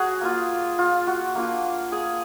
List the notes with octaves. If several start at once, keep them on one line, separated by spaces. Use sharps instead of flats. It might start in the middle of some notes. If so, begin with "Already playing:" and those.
Already playing: F#3 F#4 G#4
A#3 F4
F4
F#4
A#3 D4 F4
G#4